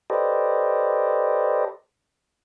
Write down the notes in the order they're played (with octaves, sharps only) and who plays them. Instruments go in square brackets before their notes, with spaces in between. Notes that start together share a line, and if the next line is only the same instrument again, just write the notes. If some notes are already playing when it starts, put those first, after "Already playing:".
[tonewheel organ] G4 A4 B4 C5 D5 D#5